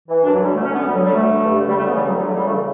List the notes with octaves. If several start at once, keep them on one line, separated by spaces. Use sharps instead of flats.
E3
F#2 D4
F#3
D3
G3
D2 A3
C#4
D3 B3
D2 G3
F#3
D3 G3
D2 A3
D3
G2
D3
G3
C#2 A3
B3
C#3 E3 G3
D2 F#3
G3
D3
F#3
C#2 G3
A3
C#3 E3